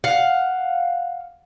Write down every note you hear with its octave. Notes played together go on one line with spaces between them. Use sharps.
F5 F#5